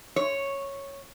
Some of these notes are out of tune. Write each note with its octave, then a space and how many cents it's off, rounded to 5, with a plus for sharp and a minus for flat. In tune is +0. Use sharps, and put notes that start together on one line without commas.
C#5 -5